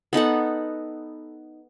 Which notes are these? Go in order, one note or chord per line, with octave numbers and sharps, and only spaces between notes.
B3 D#4 A4 F#5